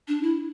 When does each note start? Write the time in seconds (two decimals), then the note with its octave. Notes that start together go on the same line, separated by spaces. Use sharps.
0.08 D4
0.23 E4